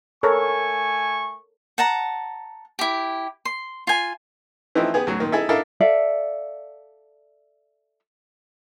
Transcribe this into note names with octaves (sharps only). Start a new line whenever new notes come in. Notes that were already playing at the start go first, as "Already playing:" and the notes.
A3 A4 A#4 C#5 G#5 C#6
F#5 A5 A#5
E4 G4
C6
F4 G#5
E3 F3 A3 C4 D#4
B3 G4 G#4
D2 F#3
A#2 D#3
D#4 E4 G#4 A4 E5
D4 E4 A4 A#4 D#5 F5
A4 D5 E5 F5